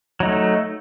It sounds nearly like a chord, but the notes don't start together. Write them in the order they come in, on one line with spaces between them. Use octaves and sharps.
F#3 D#4 A3